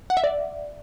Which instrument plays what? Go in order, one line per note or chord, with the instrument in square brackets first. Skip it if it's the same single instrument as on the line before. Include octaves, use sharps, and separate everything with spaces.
[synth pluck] F#5
E5
D5